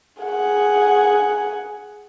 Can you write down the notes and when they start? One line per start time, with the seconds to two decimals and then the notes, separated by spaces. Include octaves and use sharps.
0.23 G#4 F#5